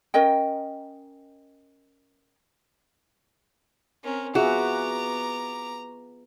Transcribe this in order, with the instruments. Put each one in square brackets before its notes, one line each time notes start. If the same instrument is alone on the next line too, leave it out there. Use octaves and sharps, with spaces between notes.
[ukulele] C#4 A#4 D#5 G5
[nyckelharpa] C4 A#4 [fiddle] C#4
[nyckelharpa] B3 D6 [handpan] F4 G#4 E5 [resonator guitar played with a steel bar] F#4 [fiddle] A#5